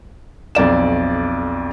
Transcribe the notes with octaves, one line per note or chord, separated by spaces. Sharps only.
B1 F2 D5 E7